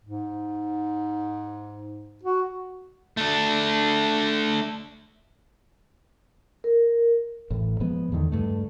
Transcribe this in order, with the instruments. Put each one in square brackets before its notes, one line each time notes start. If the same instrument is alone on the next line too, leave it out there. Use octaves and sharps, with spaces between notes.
[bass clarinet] G#2
F#4
[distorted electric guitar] A3 D4
[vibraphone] A#4
[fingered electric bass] A1 A2
G#2 F3 G#3 B3
E2 D3 D#3
C#2 G2 A3